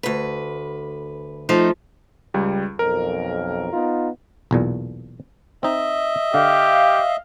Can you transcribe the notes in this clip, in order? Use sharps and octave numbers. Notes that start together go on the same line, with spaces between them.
D2 B4
F3 A3 D#4
C#2 G3
B1 F2 A#4
B3 D#4 F4
B1 E2 A#2
C4 D#4 D#5 E5
D3 G4 F5